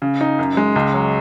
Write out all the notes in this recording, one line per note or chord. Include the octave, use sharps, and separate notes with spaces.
C#3
D#4
F#2
G#3
C#2
F#3